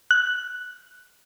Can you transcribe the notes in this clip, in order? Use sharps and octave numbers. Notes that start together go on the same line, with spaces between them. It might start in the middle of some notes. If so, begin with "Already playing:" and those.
F#6